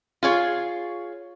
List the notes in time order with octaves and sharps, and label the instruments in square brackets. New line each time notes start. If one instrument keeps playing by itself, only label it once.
[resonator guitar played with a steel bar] F4 G#4 C#5